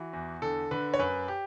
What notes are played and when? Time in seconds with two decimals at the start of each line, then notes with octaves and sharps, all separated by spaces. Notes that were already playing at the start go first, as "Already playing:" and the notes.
Already playing: E3 F#4
0.13 E2
0.42 D3 A4
0.71 D3 B4
0.94 C#5
0.99 F#2 B4
1.28 G4